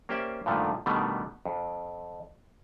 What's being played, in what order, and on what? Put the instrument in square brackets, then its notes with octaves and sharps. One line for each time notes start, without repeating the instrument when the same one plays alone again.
[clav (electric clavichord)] A#3 C#4 G4 C5 D5 E5
G2 A#2 D3 D#3 F3 A3
B2 D3 D#3 G3 A3 B3
F2